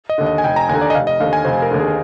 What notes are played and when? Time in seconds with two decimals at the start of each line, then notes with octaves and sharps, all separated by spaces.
0.09 D#5
0.18 D#2 D3
0.26 D#5
0.38 G#5
0.44 F1 G5
0.56 A#5
0.69 D#2 G#5
0.73 D3
0.82 D5
0.90 D#5
0.94 F1 F5
1.07 D#5
1.20 D#2 D3 F5
1.33 G#5
1.45 F1 C5
1.62 A#4
1.71 D#2 D3
1.80 G#4